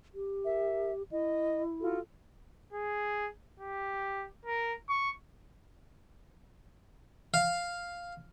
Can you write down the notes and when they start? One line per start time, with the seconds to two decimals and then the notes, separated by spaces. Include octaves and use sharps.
0.15 G4
0.45 A#4 E5
1.11 E4 D#5
1.80 F4 F#4 A4
2.73 G#4
3.60 G4
4.46 A#4
4.89 C#6
7.34 F5